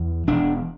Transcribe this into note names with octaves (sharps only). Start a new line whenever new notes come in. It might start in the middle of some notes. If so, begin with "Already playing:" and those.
Already playing: E2
E1 D4